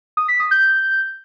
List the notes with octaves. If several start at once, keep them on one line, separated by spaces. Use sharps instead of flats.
D#6
B6
D#6
G6